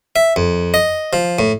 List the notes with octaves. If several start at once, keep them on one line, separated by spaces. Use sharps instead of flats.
E5
F2
D#5
F3
A2